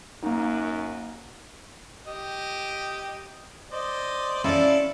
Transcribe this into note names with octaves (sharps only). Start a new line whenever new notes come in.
F#2 A#3 D#4
G4 D#5
C5 D5 D#5
C#4 E4 A4 D5 F5